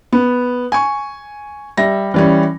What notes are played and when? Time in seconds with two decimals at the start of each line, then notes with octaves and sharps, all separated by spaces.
0.12 B3
0.72 G#5 C#6
1.77 G3 E5 A#6
2.14 E3 G3 C#4